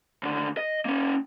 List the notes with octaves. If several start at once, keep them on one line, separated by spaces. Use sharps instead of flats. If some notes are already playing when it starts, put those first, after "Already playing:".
D#2 D3
D#5
A#3 C#4